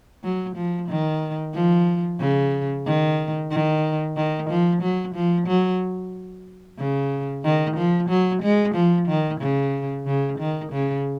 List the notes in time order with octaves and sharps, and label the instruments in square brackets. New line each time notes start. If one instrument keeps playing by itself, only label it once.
[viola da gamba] F#3
F3
D#3
F3
C#3
D#3
D#3
D#3
F3
F#3
F3
F#3
C#3
D#3
F3
F#3
G#3
F3
D#3
C#3
C#3
D#3
C#3